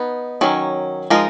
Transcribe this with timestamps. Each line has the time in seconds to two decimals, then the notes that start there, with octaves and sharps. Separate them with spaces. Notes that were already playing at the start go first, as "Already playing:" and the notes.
Already playing: B3 D#4 B4
0.41 D#3 F#3 C#4
1.10 F3 G#3 D#4 A#4